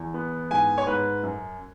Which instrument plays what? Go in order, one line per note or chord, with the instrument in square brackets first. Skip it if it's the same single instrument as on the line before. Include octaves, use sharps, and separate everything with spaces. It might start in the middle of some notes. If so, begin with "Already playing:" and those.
Already playing: [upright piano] E2
B3
G#2 G#5
C#5
G#2 B4
F#2